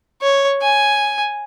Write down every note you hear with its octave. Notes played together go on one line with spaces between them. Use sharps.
C#5
G#5